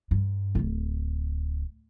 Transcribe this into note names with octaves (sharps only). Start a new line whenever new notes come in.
G2
D1 G1